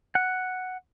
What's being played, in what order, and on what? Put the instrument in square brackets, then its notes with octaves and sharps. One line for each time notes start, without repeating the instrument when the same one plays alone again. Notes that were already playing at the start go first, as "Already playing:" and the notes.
[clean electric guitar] F#5